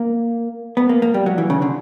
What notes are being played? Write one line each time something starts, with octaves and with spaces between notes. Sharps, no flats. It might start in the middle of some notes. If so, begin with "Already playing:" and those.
Already playing: A#3
B3
A#3
A#3
G3
F#3
E3
C#3
D3